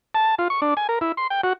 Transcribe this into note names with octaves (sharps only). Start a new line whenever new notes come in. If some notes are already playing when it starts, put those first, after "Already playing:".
A5
F4
C#6
D4
G#5
A#4
E4
C6
G5
F#4